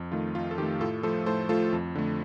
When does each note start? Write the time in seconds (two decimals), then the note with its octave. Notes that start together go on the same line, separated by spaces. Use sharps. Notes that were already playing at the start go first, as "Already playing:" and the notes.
Already playing: F2
0.12 D#3 A3 F4
0.35 F2 F4
0.51 A4
0.58 D#3 A3 G4
0.80 A2 F4 A4
1.03 F3 A3 A4 C5
1.26 A2 A4 C5
1.49 F3 A3 F4 A4
1.73 F2
1.95 D3 A3